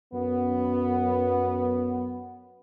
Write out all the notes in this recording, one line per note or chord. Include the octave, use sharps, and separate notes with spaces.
F#2 B3